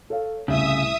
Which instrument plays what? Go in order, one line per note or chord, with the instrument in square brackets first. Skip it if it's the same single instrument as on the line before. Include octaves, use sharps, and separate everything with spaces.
[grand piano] A4 C#5 F5
[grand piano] C2 A2 [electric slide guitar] C#3 [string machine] E5 D#6